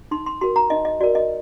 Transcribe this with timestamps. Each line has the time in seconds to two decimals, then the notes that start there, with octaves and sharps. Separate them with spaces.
0.11 D#4 C6
0.26 C6
0.41 F#4 A#4 C6
0.56 A#5
0.70 D#4 D#5
0.85 D#5
1.00 F#4 A#4 D5
1.15 D#5